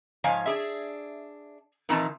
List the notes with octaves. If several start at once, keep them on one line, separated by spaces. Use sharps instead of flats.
G#2 F3 C#5 F5 G#5
D4 G#4 E5
A#2 D#3 E3 C4 A5 A#5